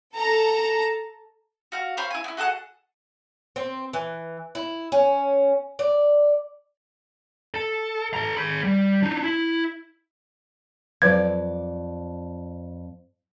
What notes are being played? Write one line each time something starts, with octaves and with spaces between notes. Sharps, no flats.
A4 A5 A#5
F#4 F5
C5 C#5 F5 B5
E4 G#5
B3 E4
F#4 G#4 A4 F#5
C4
E3
E4
C#4
D5
A4
A4 A#5
G#4 B5
G3
D4 D#4
E4
F2 F#3 B4 D5 F5 G#6